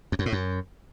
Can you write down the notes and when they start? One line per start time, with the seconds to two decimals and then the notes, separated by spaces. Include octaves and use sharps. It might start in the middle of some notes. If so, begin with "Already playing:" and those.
0.12 F2
0.19 F#2
0.26 A2
0.33 F#2